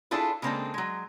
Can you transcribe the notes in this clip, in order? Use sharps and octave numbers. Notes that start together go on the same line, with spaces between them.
D4 E4 F4 G#4 A4 B4
C#3 G#3 A#3 C4 D4 A4
F#3 G#3